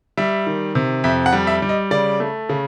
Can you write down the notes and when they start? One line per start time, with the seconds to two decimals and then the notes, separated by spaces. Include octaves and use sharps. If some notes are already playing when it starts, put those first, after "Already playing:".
0.17 G3 E5
0.47 D#3
0.75 C3
1.04 F2 E5
1.26 F#5
1.33 G3
1.47 E5
1.62 G3
1.69 D#5
1.91 C#3 D5
2.20 A3
2.49 C#3